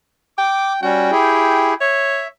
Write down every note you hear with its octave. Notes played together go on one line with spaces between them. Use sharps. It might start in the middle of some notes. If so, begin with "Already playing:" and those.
G5 D6
G3 C#4 F#4 G5
E4 G4 G#4
C#5 E5